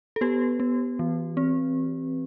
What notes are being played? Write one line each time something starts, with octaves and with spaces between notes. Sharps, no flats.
A4
B3 G4 B4
B3
E3
C4